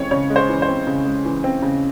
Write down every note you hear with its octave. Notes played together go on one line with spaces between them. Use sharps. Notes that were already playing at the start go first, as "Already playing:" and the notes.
Already playing: C#3 E3 G#3 C4 C#5
C#3 C#5
G#3
C5
E3
C5
C4
C#3
G#3
E3
C4
C#3